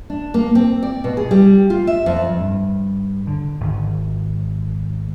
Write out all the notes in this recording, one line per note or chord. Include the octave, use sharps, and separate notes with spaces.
D4
A#3
C4
D5
B2
G#4
G3
F4
E5
F2
G2
D3
G#1